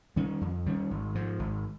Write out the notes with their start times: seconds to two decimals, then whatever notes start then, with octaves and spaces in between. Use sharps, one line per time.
0.16 D#3 G3 C#4
0.41 F2
0.66 D#3 G3 C#4
0.91 G#1
1.15 G#2 F3
1.39 G#1